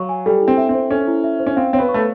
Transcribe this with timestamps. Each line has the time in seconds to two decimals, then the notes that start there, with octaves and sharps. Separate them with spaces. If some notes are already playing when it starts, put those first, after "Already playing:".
Already playing: F#3 C#5 F5 C#6
0.09 G#5
0.26 G3 A4
0.41 E4
0.48 C4
0.58 E5
0.69 C4
0.75 C5
0.90 C#4 A4
1.07 E4
1.24 E5
1.40 C5
1.46 C#4
1.56 C4 F5
1.73 C4 C#5
1.79 B3
1.89 C#6
1.94 A3